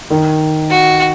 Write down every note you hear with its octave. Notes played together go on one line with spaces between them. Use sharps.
D#3
F#4